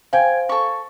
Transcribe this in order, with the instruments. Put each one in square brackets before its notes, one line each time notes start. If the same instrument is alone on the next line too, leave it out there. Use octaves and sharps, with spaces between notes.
[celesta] C5 F5 [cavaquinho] G5 G#5
[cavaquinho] A4 C#6